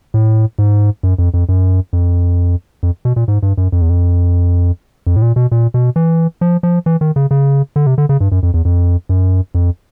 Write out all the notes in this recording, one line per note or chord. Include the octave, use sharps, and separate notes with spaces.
A2
G#2
F#2
F2
F2
F#2
F2
F2
B2
A#2
G#2
G2
F#2
F2
E2
F2
F2
A2
A#2
B2
A#2
B2
E3
F3
F3
E3
D#3
C#3
C#3
D3
C3
D3
C#3
G2
F#2
F2
E2
F2
F#2
F2